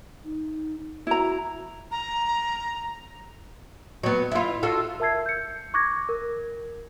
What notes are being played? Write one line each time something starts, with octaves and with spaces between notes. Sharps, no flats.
D#4
E4 F#4 A#5
A#5
F#3 B3
E4 F4
F4 F#4 A4
A#4 E5 A5 E6 G#6 C7
G6 C#7
C#6 D6 F#6 G#6 A#6
A#4